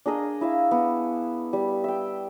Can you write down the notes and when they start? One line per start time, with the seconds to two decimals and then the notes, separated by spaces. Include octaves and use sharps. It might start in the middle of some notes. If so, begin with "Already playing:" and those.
0.06 D4 G#4 A#4 D#5
0.41 E4 E5 F5
0.71 B3
1.53 G3
1.84 E5 G5